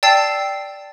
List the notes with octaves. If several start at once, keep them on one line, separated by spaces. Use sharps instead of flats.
D5 G5 A5 E6 A6 C7